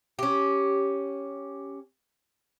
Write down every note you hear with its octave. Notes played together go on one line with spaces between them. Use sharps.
C#4 G4